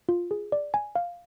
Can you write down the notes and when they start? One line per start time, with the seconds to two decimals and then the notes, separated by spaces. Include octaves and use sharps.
0.09 F4
0.31 G#4
0.52 D5
0.74 G#5
0.96 F5